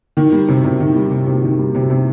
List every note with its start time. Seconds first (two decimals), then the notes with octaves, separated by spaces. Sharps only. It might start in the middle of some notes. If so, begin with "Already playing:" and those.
0.17 D#3
0.32 G3
0.49 C3
0.64 C3
0.80 D#3
0.96 G3
1.11 C3
1.27 C3
1.43 D#3
1.59 G3
1.75 C3
1.90 C3